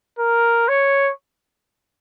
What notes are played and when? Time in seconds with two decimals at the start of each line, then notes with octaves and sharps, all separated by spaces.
0.19 A#4
0.68 C#5